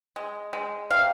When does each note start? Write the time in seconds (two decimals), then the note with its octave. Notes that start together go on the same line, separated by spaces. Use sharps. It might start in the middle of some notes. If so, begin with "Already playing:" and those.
0.16 G#3
0.53 G#3
0.90 C3 F5